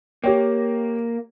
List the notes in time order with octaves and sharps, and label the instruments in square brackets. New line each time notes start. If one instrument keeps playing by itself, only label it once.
[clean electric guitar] A#3 [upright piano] G4 C#5 G5